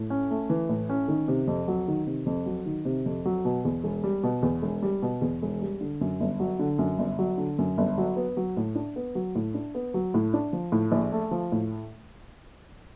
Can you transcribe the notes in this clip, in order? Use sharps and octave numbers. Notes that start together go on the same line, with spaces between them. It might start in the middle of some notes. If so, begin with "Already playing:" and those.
Already playing: A2
C#4
A3
E3
A2
C#4
D#3
C3
F2
F#3
D#3
C3
F2
F#3
D#3
C3
F2
F#3
B2
E2
E1
G3
B2
E2
E1
G3
B2
E2
E1
G3
D3
F#2
G1
F#3
D3
F#2
G1
F#3
D3
F#2
G1
F#3
B3
F#3
A2
D4
B3
F#3
A2
D4
B3
F#3
A2
D4
F3
A2
A#1
A3
F3
A2